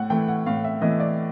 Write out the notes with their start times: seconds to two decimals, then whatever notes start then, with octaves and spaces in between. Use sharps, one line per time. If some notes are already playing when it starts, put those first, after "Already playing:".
Already playing: A2 F#5
0.10 E3 A3 G5
0.28 F#5
0.46 A2 F5
0.64 E5
0.81 E3 A3 D#5
1.00 D5